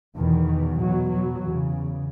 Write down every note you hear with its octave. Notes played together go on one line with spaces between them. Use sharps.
E2 B2 D#3
E2 B2 F#3
F#3
E2 C#3